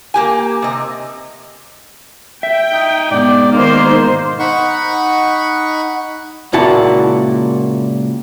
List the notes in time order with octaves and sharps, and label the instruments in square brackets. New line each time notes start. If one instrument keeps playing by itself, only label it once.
[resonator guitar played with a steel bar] A#3 G4 G#5
C3 D#5
[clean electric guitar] E5 [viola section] G5
[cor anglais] D#4
[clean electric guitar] G#2 B2 [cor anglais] D5
[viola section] D#3 C5 [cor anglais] A#3
[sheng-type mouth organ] D#4 F#5 B5 C#6
[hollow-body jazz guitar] C#2 A#2 E4 F#4 A5